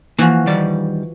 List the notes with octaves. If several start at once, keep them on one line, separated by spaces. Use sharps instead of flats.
E3 F3 A#3 F#4
D#3 G3 D5